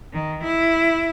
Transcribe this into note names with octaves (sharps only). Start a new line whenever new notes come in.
D#3
E4